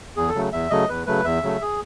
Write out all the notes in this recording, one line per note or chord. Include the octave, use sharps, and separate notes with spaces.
E2 G#4
A4
C#3 F#3 A3
E2 E5
C#3 F#3 A3 D#5
E2 B4
C#3 F#3 A3 B4
E2 E5
C#3 F#3 A3
G#4